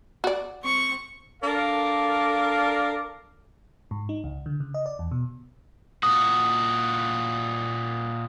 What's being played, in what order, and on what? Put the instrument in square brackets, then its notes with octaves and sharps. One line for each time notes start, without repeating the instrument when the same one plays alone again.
[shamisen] F#4 D5
[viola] C4 C#6
[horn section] D4 A4 A#4 D5 F5
[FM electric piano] G#2
D#4
C#2
D3
C#3
D#5
D5
E2
B2
[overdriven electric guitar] A#2 F#4 [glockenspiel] D#6